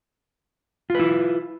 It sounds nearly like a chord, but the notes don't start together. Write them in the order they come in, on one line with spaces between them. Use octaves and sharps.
F4 B4 E4